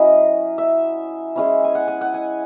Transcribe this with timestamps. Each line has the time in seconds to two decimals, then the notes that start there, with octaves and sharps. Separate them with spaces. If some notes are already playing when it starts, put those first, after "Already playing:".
Already playing: F#3 C#4 E4 D#5
0.58 E5
1.36 G#3 C#4 E4
1.64 G#5
1.75 F#5
1.88 G#5
2.01 F#5
2.14 G#5